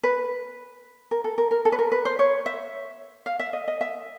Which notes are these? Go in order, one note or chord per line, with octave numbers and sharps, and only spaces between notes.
B4
A#4
A4
A#4
A#4
A4
B4
A#4
B4
C5
C#5
E5
F5
E5
D#5
D#5
E5